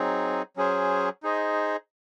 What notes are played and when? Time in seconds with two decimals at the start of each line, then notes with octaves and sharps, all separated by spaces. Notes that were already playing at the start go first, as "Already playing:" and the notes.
Already playing: F#3 C4 D#4 G#4
0.56 F#3 C#4 G#4 C5
1.23 D#4 G#4 C5 D#5